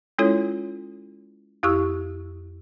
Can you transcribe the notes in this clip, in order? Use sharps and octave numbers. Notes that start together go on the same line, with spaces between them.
G#3 C#4 E4 F4 A4 C#5
F2 E4 G4 C#6 E6